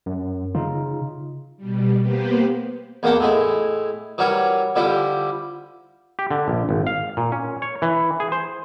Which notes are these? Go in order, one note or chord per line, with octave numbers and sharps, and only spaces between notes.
F#2
C#3 D#4 F4
B2 G3
A#3 B3 G4 B4 C5
E2 A#3 D4 F#5 G5 A5
A2 G#3 E4
E3 F#3 G3 A#4 C#5
D3 F3 G3 E4 G4
G4
D3
A#1
G#1
F5
A#2
C#4
C#5
E3
G#4
C5